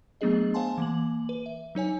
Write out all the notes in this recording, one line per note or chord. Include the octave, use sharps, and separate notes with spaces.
F#3 A3 B3 D4 G#4 D#5
C5 F5 F#5 G#5 A5 C6
E3 A#3 F#7
B4
E5
F#3 D#4 C#5 G#5